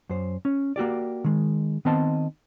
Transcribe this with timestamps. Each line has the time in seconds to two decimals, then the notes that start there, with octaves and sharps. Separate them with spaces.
0.09 F#2 C5
0.45 C#4
0.76 A#3 F#4 G4 D5
1.24 D#3 G#3
1.85 D#3 B3 C4 D#5 A5 C6